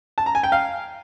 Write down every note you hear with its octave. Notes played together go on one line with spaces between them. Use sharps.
A5
A#5
G#5
G5
F5